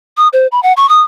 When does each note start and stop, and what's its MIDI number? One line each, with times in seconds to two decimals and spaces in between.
0.17 0.28 87
0.33 0.47 72
0.52 0.60 83
0.63 0.73 78
0.77 0.88 85
0.89 1.02 87